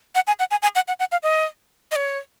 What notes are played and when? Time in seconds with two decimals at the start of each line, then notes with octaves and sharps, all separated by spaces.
0.15 F#5
0.27 G#5
0.39 F#5
0.51 G#5
0.62 G#5
0.75 F#5
0.88 F#5
0.99 F#5
1.12 F5
1.23 D#5
1.91 D#5
1.96 C#5